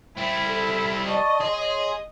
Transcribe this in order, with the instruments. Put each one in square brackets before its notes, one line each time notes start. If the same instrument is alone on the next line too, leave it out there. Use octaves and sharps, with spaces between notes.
[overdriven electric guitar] G3 C4 [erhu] E4
[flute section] A4
[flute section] D5 A5 C#6 [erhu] D#5
[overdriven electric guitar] G#4 [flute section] C#5 C6